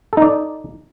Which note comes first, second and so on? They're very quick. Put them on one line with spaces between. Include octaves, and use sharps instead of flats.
A4 D#4 D5